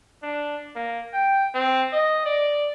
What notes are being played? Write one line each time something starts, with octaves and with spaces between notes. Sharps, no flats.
D4
A#3
G5
C4
D#5
D5